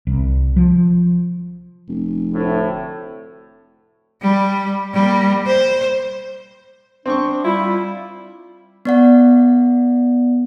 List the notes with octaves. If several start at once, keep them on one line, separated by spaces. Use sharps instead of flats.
C2
F3
F1
D2 A2
G3
G3 A#3
C5
C4 D4 C5 C#6
G3 E4 F4
B3 D5 F#5